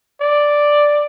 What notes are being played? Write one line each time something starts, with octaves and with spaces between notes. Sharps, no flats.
D5